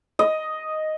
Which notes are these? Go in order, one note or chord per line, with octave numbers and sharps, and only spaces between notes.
D#5